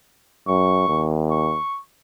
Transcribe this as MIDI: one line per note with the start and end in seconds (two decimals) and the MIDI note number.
0.48 0.86 42
0.48 1.10 85
0.88 1.57 39
1.31 1.80 85